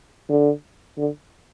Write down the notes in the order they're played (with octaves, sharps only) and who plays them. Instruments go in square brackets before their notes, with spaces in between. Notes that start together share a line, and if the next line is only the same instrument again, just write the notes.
[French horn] D3
D3